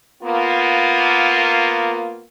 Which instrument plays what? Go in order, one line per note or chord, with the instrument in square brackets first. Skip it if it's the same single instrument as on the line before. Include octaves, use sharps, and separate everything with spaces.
[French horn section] A#3 B3 F4